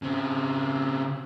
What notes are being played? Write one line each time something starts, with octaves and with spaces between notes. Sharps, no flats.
C#3 C4